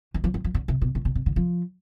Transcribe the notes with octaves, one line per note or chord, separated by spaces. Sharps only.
E3
F3
G3
F3
D3
C3
B2
A2
B2
C3
D3
F3